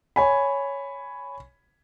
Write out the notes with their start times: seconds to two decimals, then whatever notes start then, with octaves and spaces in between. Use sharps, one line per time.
0.16 C#5 G#5 B5